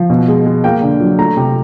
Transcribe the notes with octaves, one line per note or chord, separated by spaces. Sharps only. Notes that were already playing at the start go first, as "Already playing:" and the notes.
Already playing: F3
B2
G#3
G#3
A#3 G5
D3
F#3
A3 A#5
C3